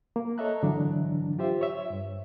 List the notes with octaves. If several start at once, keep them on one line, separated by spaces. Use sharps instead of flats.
A#3
A4 C#5 D#5 E5 A#5 F#6
G#2 D3 E3 F#3 D4
F4 G4 C5 E5
C#5 E5
G2